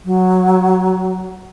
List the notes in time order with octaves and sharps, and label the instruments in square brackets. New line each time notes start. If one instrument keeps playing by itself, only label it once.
[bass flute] F#3